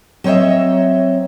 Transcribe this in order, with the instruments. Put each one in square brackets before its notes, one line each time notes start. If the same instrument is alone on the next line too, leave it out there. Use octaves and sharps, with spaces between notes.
[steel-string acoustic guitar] F#3 C4 C#5 D#5 E5